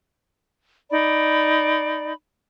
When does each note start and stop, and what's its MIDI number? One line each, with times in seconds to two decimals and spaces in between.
0.91 2.13 63
0.91 2.13 74
0.91 2.13 83